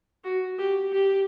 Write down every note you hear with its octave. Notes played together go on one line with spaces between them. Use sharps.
F#4
G4
G4